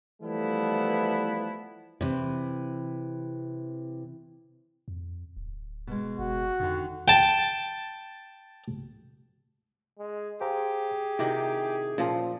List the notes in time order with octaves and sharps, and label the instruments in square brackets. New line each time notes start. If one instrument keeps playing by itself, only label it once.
[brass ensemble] E3 F3 G3 A3 B3 E4
[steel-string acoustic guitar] C3 E3
[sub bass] F2
D1
[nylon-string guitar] B2 G#3
[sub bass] F#1 [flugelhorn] F#4
[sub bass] F2 [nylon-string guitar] D3 D#3
[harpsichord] G5 A5
[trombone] G#3
[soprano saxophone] G4 [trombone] G#4 [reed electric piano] C5 F5 A#5
[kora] C3 D#3 [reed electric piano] E4 F#4 D6
[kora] A#2 F3 [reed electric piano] C#4 F4 C5